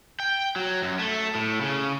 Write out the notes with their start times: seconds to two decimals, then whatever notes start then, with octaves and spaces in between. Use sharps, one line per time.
0.20 G5
0.56 F#3
0.82 F#2
0.99 A3
1.35 A2
1.61 C#3